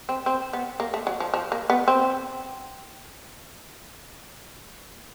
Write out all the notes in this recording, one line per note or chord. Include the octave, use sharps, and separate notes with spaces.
C4
C4
B3
A#3
A3
F#3
F3
F3
A#3
B3
C4